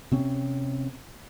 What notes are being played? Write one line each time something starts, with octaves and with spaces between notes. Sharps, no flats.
C3 C4 C#4